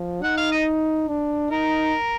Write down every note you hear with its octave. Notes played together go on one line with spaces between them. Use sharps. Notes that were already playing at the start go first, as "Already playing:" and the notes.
Already playing: F3
D#4 F#5
F5
D#5
D4
D#4 A#4